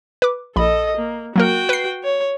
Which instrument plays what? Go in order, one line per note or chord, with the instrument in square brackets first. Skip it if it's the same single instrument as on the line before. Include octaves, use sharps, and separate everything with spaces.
[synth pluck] B4 D6
[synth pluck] A#1 B5 [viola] A4 D#5
[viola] A#3
[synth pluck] F#3 A#3 A#4 [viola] F#4 G5
[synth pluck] B4 C7
[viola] C#5